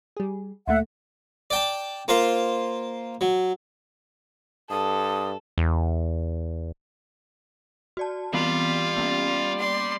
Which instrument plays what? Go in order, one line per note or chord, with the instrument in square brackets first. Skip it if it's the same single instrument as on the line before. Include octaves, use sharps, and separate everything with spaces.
[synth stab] G3 G#4
[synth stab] D2 A#2 A3 [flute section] E5 F#5
[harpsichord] D5 G5 A5
A#3 F4 C5 F5
F#3
[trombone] G2 [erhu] A4 [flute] D#6
[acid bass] E2
[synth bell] F#4 D5 A5
[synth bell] E3 B3 C4 [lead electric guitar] G3 [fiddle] F4
[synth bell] A#3 B3 C#4
[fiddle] D5 C6